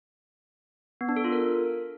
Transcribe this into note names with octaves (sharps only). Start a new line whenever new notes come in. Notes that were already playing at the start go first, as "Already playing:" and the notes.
B3
D4
A4
F4
A#4